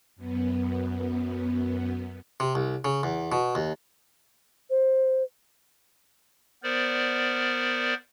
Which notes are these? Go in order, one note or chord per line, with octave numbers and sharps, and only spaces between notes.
F#2 B3
C3
C2
C#3
E2
B2
D#2
C5
B3 A#4 C5 D5